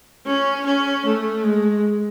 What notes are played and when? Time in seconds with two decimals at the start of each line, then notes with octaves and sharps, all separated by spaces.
0.26 C#4
0.65 C#4
1.05 A3
1.44 G#3